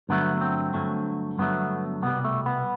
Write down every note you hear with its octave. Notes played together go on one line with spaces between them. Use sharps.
G2 D3 F#3 A3 B3
C4
G2 D3 F#3 A3
G2 D3 F#3 A3 B3
C2 B2 G3 B3
A3
B3